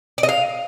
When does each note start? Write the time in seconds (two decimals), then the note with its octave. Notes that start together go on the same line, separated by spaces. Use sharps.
0.18 D5
0.23 D#5
0.29 F5